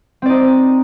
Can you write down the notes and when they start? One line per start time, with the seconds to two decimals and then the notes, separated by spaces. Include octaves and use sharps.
0.22 C4
0.26 D5
0.29 D#4